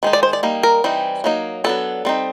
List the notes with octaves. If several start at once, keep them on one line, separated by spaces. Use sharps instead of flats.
D#3 G#3 D#4
D5
C5
D5
G3 A#3 D#4
A#4
E3 G3 C4 D#4
F#3 A#3 D#4
F#3 B3 D4 A4
G3 C4 D#4